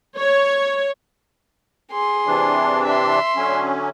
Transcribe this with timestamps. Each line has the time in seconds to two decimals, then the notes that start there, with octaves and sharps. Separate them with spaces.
0.18 C#5
1.92 G#4 C6
2.27 C3 E3 D4
2.85 E5 C6
3.36 D3 F#3 C#4